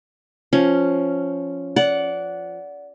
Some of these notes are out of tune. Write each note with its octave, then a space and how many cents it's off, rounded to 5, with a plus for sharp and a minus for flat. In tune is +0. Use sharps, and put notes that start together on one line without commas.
F3 +0 C#4 +0
D5 -25 F#5 +0